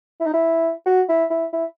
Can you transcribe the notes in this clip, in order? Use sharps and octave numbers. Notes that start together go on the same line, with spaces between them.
E4
D#4
E4
F#4
E4
E4
E4